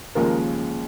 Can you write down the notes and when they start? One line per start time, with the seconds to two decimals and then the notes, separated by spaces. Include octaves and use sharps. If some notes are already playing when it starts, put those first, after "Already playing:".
0.15 D#2 C#3 F3 G#3 A#4